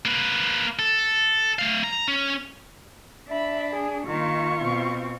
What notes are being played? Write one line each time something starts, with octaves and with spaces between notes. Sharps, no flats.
A#3 B4
A4
A3 F5
A#5
C#4
D4 E5 B5
G#4
D#3 A#3 F4 C#6
B2 C4